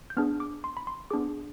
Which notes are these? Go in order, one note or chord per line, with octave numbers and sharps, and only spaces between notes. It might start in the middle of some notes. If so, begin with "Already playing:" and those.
G6
B3 D4 G#4 F6
D6
C6
B5
C6
B3 D4 G#4 D6